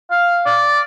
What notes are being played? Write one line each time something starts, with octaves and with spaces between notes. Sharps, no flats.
F5
D5